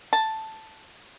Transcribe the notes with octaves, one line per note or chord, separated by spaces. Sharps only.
A5